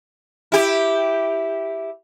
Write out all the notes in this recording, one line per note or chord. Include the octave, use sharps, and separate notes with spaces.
E4 G4